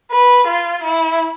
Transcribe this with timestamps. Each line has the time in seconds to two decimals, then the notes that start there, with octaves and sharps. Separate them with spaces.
0.11 B4
0.47 F4
0.83 E4